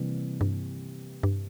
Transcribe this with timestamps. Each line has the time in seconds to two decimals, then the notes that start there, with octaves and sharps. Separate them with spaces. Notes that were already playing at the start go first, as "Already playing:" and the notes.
Already playing: C3 E3 G3 A#3
0.41 G2
1.23 G2